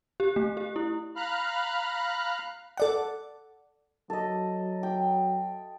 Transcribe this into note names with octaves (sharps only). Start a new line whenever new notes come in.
G4
A3
G4
E4
F5 A#5 B5 F6 F#6
A4 D5 F#5
F#3 A4 D#5
G5